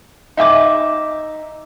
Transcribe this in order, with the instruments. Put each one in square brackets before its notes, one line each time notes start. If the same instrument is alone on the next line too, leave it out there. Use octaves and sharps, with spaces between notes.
[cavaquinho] D#4 E5 G5 D6